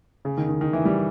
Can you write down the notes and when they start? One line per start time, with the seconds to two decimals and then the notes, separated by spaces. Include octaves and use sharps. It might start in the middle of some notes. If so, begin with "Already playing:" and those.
0.25 C#3
0.37 D#3
0.49 D#3
0.61 D#3
0.73 E3
0.85 G3